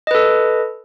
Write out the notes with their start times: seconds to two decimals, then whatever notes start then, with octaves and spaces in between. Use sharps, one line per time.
0.07 D#5
0.11 B4
0.15 A4